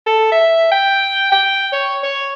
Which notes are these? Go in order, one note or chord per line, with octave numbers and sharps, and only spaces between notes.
A4
E5
G5
G5
C#5
C#5